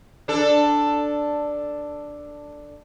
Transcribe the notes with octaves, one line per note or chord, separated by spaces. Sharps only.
D4 A4